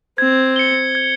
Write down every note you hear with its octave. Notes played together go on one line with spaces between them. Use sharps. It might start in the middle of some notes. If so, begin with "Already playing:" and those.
C4 G#6
C#7 G7
G#6